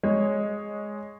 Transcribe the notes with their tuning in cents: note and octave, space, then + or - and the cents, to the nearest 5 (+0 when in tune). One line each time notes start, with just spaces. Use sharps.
G#3 +0 C#5 +0